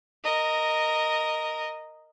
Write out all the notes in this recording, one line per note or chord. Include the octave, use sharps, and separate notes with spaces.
A#4 D#5